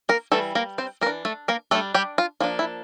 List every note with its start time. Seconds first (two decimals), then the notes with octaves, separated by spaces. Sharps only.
0.09 A#3 A#4
0.32 E3 G3 A3 A4
0.55 A#3 A#4
0.78 C4 C5
1.01 E3 A#3 A#4
1.06 D4
1.25 A3 A4
1.48 A#3 A#4
1.71 A3 D4 A4
1.75 G3
1.94 G3 G4
2.18 F4
2.40 F3 A#3 D4 F4
2.59 E4